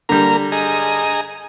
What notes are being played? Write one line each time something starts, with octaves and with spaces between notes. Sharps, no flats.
D3 G3 A#3 A#4
G#4 D#5 A#5